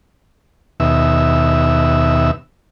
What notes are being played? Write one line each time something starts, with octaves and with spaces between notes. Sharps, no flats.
D#2 B2 E5